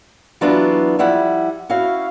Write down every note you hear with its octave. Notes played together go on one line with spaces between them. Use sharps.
E3 F#3 B3 D4 E4 F4
F3 G3 E4 F#5
C#4 E4 F#4 F5